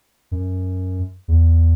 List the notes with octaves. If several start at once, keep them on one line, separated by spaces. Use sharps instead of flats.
F#2
E2